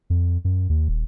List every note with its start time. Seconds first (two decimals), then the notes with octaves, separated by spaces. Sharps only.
0.10 F2
0.44 F#2
0.69 D#2
0.88 D#1